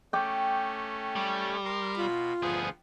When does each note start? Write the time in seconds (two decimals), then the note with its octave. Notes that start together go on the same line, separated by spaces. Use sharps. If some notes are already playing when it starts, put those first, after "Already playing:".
0.13 A3 C#4 G5 D6
1.16 G3
1.64 A#4 C6
1.98 B2 F4 B5
2.42 D2 F3 B3 G#4